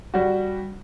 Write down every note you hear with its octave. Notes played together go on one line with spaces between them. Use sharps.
G3 F#4